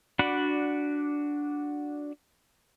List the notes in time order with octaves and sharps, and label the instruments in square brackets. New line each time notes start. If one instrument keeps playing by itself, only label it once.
[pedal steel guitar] D4 F#4 D5 F#5 B5